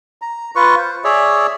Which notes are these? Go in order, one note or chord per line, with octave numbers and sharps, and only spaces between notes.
A#5
F4 B4 C#6
C5
G#4 C#5 D5 E5